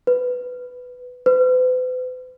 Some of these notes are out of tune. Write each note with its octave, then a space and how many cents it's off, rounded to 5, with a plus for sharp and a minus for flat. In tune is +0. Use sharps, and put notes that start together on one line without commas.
B4 +5
B4 +45